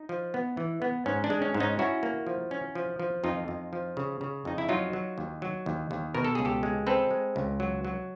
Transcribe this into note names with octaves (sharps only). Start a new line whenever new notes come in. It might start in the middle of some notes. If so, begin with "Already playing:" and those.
Already playing: D#4
F3
B3
E3
B3
G#2 C#4
D4
G#3
C#4
G#2
C#4 D#4
C#4 E4 F#4
A#3
F3
C#4
F3
F3
F2 D#4 F4
F2
F3
C#3
C#3
F2 D#4
E4
F#3 D#4 F4
F#3
D#2
F#3
D#2
D#2
B2 A#4
A4
C#2 G#4
G4 A4
G#3
C4 A4 B4
G#3
C#2
F#3
F#3